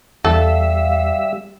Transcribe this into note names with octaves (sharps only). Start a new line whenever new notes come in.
E2 G3 A4 E5 F5